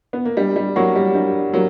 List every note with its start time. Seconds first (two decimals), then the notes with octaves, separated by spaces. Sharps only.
0.13 B3
0.25 A#3
0.37 G3 D4
0.56 G3
0.76 F#3 A#3 G4 C#5 F#5 C#6
0.96 G3
1.15 G3 D4
1.53 F#3 A#3 G4 C#5